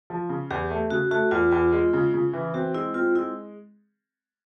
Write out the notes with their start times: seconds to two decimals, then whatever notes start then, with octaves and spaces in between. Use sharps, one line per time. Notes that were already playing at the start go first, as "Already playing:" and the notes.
0.10 F3
0.29 C#3
0.51 E2 G4
0.71 A3
0.90 C#3 F#4
1.11 A3 F#4
1.31 E2 F4
1.52 E2 F4
1.73 G#3
1.93 C#3
2.14 C#3
2.33 E3
2.54 C4 F#4
2.74 G#3 E4
2.94 C4 F4
3.15 G#3 E4